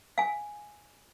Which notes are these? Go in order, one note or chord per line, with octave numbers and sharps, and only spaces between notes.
F5 G#5